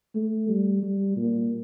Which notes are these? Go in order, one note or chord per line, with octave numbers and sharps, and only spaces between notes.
A3
G3
G3
A#2